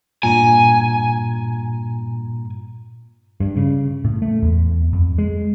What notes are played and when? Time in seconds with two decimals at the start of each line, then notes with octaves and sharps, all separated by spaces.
0.23 G2 A#2 G#5 A#5
3.40 G2
3.57 C#3
4.05 A2
4.22 A3
4.42 E2
4.93 F2
5.18 G#3